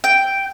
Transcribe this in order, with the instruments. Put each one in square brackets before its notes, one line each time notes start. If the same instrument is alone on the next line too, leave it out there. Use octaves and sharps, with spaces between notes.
[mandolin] G5